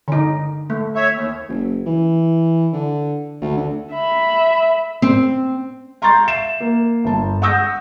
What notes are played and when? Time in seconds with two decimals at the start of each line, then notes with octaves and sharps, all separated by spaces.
0.08 D3 D#4
0.70 A3
0.95 C#5 E5
1.12 D#2
1.48 F#1
1.86 E3
2.73 D3
3.42 D2
3.57 D3
3.93 E5 B5
5.02 C4
6.02 F5 A#5 C6 C#6 G6 A6
6.28 E5 C7 E7
6.60 A#3
7.04 G1 A5
7.42 F#5 C#6 D#6 E6 G6 A#6